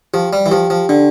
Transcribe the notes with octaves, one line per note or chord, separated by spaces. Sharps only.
F3 G4
G3
E3
F3 G4
F3
D3 D4